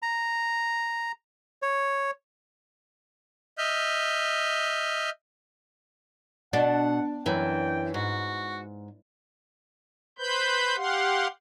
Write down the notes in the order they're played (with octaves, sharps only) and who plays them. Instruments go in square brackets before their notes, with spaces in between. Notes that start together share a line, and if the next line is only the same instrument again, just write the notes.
[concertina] A#5
C#5
[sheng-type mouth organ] D#5 E5 F6 G6
[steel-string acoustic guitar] B2 [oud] D4 [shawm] F#5
[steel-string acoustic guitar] F#2 E3 [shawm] G5
[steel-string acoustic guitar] G#2 [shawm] F#4
[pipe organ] B4 C5 B5 G6
G4 F5 F#5 C6